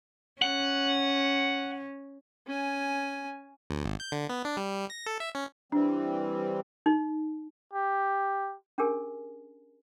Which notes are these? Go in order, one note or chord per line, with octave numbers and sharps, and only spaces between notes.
C#4 F#5
C#4 G#5
D2
G#1
G6
D3
B3
D4
G3
A#6
A4
E5
C#4
E3 G3 C4 D4
D#4
G4
C#4 D4 G4 G#4 A#4 G#5